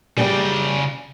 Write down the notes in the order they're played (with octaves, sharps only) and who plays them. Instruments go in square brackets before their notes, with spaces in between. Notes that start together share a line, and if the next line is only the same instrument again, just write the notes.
[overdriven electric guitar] C#3 G5 [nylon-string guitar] G3 G4 D5